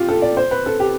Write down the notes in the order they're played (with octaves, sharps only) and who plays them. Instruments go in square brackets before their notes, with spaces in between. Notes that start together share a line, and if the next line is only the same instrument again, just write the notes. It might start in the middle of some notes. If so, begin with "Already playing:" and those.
Already playing: [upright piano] F4 G4
A4
D5
C5
B4
A4
G4